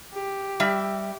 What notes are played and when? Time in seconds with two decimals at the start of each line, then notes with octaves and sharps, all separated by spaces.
0.14 G4
0.60 G3 E5